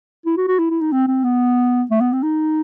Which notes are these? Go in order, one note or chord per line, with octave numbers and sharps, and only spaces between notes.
E4
F#4
F#4
E4
E4
D#4
C4
C4
B3
A3
B3
C4
D#4